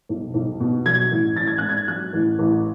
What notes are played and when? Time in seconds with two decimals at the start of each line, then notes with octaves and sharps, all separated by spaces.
0.09 B1
0.34 B1
0.60 B2
0.86 F#3 G#6
1.11 A1
1.36 A1 A6
1.47 G#6
1.58 G#2 F#6
1.69 G#6
1.88 F#3 F#6
2.13 A1
2.39 A1